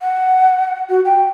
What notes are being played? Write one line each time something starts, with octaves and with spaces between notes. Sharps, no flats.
F#5
F#4
G5